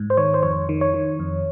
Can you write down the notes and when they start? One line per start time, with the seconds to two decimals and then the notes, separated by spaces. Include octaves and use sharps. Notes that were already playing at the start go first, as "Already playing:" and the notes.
Already playing: G#2
0.10 C5
0.17 D#3 C#5
0.34 C5
0.43 F2 C#5
0.69 D#3
0.81 C#5
0.94 D#3
1.19 F2